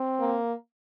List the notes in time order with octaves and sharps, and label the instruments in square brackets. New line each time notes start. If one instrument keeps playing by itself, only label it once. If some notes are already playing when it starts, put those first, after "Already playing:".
Already playing: [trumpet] C4
[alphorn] A#3